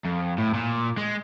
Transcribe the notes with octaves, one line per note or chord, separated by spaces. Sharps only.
F2
A2
A#2
G#3